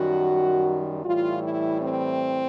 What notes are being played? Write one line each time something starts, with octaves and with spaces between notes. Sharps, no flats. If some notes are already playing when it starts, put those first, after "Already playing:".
Already playing: F#2 D#3 G3 F#4
A2 E3 G3 F4
E4
C4